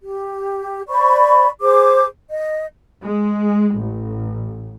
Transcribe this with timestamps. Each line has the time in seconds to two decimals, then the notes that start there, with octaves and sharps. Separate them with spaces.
0.01 G4
0.89 C5 D5 B5 C#6
1.61 G#4 C5 D6
2.29 D#5
3.04 G#3
3.79 A1